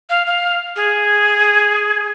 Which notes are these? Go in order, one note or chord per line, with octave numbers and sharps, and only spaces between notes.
F5
F5
G#4